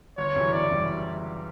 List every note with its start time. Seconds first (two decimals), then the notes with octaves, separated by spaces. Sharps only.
0.18 G1 C#5
0.35 F#2 C#3 E3 G3
0.52 G1 D5
0.71 F#2 C#3 E3 G3